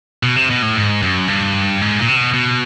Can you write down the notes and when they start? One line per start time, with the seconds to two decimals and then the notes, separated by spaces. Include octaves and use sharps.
0.23 B2
0.36 C3
0.50 B2
0.62 A2
0.77 G#2
1.02 F#2
1.28 G2
1.81 G#2
1.99 A#2
2.08 C3
2.16 B2
2.34 B2